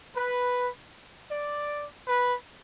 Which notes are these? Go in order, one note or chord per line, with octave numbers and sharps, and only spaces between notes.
B4
D5
B4